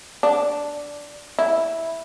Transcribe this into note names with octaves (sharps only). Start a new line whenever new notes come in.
D4
E4